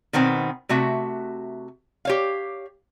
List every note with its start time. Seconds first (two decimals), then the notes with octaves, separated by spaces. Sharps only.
0.13 B2 D#3 B3 C4
0.69 C3 A3 F#4 E5
2.05 G4 C#5 F5